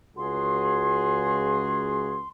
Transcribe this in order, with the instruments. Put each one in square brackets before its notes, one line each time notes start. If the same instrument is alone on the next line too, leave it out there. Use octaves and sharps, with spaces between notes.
[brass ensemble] C#2 F#4 G#4 [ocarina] C6